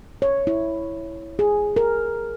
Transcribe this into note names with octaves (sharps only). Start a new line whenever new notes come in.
C#5
E4
G#4
A#4